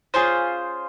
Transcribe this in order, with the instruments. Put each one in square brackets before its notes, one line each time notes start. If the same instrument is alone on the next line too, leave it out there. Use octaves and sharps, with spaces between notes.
[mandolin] C#4 F4 G#4 C5